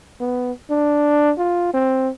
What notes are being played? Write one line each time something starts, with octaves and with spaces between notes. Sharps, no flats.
B3
D4
F4
C4